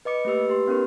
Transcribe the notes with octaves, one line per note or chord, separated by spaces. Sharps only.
B4 D#5 D6 C#7
A3 A#3 G4 B4 E6
G4 C6
B3 C#4 D#4 A#4 B4